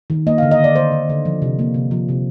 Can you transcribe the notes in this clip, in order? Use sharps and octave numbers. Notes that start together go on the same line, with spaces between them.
D#3
A#3 D#5
D3 F5
D#5
D3 D5
D3 C5
D3
D3
F3
C3
A#3
C3
F3
C3